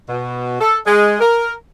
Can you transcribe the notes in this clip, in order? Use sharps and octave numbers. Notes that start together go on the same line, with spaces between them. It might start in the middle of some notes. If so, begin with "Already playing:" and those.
B2
A4
G#3
A#4